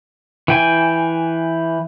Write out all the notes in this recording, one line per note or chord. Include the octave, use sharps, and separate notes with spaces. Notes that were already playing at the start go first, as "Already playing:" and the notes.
E3 G5 G#5